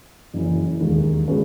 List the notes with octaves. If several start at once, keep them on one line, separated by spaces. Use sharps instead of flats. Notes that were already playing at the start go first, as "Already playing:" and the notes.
F#1 F#2 E3
E1 D#2 D#3 G#3
C#3 G#3 C#4 F#4 B4